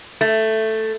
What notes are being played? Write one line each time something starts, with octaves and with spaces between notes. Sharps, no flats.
A3